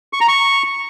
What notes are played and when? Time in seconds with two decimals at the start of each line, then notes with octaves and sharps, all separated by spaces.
0.13 C#6
0.21 A#5
0.28 C#6